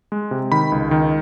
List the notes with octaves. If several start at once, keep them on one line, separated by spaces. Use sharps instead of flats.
G#3
C3
D#3 B5
C#2
D#3